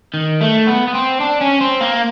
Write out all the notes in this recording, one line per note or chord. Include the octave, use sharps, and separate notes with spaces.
D#3
A3
B3
B3
C4
D4
C#4
C4
A#3